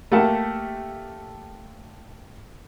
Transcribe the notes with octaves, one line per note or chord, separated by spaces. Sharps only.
A3 A#3 G4 A#4 F#5 A5